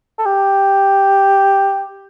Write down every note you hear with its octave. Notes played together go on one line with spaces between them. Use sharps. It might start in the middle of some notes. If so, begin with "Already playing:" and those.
A4
G4